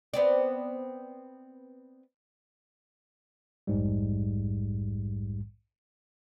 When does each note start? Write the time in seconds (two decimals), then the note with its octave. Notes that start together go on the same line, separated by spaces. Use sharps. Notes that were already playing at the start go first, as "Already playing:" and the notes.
0.14 B3 C4 D5
3.67 A#1 F2 G#2 G3